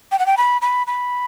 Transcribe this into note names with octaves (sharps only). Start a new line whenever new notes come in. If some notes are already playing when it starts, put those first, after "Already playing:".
G5
F#5
G5
B5
B5
B5